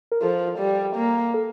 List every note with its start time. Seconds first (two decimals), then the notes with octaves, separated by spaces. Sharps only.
0.12 A#4
0.22 F3 A4
0.59 G3
0.96 A#3
1.34 A4